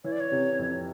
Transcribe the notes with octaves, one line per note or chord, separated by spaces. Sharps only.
E3 C#5
D5
C#5
C3
F2